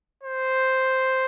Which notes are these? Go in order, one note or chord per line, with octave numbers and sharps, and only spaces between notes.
C5